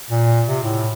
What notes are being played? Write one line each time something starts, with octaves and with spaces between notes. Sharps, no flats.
A#2
C3
A2